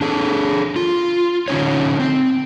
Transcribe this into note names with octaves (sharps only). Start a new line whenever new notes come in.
D4 G#4 A4
F4
D3 C#4 D#4 C#5
C4